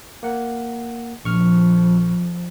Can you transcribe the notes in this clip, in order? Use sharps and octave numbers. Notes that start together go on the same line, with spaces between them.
A#3 F#5
A#1 F2 C#6 F6